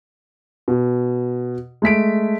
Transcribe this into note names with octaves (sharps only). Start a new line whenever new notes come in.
B2
G#3 A3 B6 D7